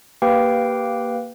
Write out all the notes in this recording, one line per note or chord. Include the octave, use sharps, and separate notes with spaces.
A#3 G4 B4 F5 G5